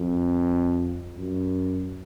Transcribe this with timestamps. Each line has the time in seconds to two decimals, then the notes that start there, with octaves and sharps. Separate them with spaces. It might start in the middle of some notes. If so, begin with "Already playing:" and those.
Already playing: F2
1.17 F#2